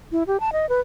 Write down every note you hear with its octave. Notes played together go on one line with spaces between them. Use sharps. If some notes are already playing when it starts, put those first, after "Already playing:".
E4
G4
A5
D#5
B4